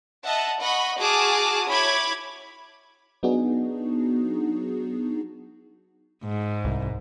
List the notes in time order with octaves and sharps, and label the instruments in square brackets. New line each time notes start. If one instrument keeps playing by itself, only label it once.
[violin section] D#5 E5 F#5 A5
D#5 F#5 B5 C#6
F#4 G#4 A5 D6 D#6 F6
E4 C#5 B5 D6 G#6
[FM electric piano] F#3 B3 D4 D#4 F#4 G#4
[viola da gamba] G#2
[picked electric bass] C2